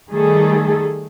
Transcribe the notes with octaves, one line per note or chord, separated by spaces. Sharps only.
D#3 G3 A3 G#4 A4